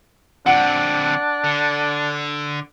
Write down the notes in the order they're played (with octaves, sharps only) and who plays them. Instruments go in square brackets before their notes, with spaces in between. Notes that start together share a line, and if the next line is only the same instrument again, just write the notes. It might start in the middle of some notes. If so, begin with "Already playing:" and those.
[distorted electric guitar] D3 C4 [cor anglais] D4 [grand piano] F#5
[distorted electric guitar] D3